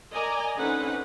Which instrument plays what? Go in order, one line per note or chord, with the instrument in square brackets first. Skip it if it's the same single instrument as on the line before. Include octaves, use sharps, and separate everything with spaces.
[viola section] A#4 D5 D#5 G#5 A#5
D3 C4 C#4 D#4 B4 F#5